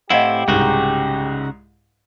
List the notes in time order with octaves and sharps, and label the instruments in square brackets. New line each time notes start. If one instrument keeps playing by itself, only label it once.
[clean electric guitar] A2 C4 E4 [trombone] G4 [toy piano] D#5 F5 F#5
[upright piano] C2 G#2 [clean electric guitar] C#3 D#4 F#4